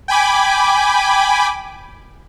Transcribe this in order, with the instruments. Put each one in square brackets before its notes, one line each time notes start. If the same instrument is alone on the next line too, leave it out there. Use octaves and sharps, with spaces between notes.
[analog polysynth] G5 G#5 B5 D6